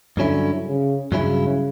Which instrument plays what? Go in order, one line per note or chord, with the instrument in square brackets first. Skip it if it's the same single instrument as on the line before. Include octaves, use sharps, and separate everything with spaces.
[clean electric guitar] G2 F#3 C#4 E4 [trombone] D3
[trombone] C#3
[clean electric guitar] G2 F#3 C#4 E4 [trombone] C#3